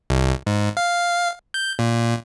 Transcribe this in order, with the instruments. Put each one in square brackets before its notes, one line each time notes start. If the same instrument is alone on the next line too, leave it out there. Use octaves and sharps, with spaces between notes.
[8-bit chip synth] C2
G#2
F5
G6
A#2